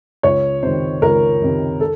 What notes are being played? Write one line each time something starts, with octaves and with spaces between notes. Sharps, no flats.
C#2 C#5
C3 D#3 C5
C#2 A#4
C3 D#3
A4